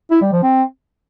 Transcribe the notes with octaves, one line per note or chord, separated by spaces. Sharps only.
E4
G3
F3
C4